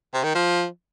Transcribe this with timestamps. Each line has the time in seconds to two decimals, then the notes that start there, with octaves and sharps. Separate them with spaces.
0.14 C3
0.24 D#3
0.35 F3